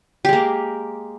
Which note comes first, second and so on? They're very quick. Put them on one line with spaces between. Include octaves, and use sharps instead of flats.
G4 G#3 A#3